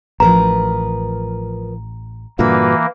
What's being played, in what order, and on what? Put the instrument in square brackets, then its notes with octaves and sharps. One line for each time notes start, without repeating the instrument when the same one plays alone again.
[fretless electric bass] A1 [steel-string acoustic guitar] F3 A#4 B4 [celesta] A#5
[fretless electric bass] G2 A#2 D3 [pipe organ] E3 A#3 [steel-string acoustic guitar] F#4 B4